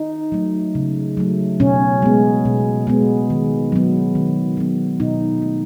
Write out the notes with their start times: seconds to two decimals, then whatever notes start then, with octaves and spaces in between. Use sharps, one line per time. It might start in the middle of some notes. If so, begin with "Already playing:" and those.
Already playing: D#4
0.32 F#3 A3
0.75 C#3
1.17 F#3 A3
1.60 B2 C#4
2.02 G#3 B3
2.45 B2
2.87 G#3 B3
3.30 D#3
3.72 F#3 B3
4.15 D#3
4.57 F#3 B3
5.00 B2 D#4
5.42 A3